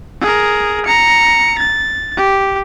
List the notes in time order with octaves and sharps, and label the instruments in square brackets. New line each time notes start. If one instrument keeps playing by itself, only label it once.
[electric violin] G#4 A#4
A#5 C#7
A6
G4